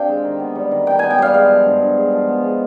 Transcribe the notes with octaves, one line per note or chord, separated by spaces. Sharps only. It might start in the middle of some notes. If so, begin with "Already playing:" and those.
Already playing: C3 D4 F5 G5
G#3
D#3
B3
G3
D#3
D#3 G5
B3 G#5
G5
G3 F5
G#3 F5
F3
G2
G2
G#3
F3
B3
G#3